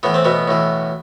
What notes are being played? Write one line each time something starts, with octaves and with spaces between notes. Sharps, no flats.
A2 E3 B3
C4
B2 B3
A2 E3